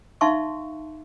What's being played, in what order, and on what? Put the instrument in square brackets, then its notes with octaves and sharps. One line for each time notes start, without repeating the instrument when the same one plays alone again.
[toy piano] D#4 E5 F5 A5 C6 C#6